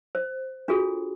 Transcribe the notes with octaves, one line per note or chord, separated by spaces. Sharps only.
C5
D4 F4 F#4 G#4 A4